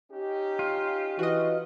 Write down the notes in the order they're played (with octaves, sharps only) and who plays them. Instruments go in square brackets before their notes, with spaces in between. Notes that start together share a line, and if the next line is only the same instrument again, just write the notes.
[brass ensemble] C#4 D#4 G4
[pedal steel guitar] F4
[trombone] E3 [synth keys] F#4 D#5